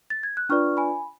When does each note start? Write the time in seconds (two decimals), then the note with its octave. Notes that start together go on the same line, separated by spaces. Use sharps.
0.10 A6
0.23 G#6
0.37 F#6
0.49 D4 F4 B4 D5 C#6 F6
0.77 G#5 B5